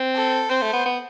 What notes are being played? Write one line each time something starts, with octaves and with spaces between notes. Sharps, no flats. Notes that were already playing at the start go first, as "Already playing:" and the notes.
Already playing: C4
A4
C4 C5
A3
B3
B3